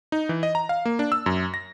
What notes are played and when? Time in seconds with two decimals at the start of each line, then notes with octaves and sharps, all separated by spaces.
0.12 D#4
0.29 E3
0.43 D#5
0.55 A#5
0.69 F5
0.85 A#3
0.99 D4
1.12 E6
1.26 F#2
1.54 A#6